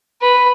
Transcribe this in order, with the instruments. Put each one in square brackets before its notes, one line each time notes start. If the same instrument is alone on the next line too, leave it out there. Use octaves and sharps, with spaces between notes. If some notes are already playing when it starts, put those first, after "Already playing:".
[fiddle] B4